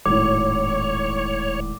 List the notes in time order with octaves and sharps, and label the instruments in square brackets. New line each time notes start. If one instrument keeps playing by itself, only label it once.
[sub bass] D#1 [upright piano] G#1 A2 [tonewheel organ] C#5 [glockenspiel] D6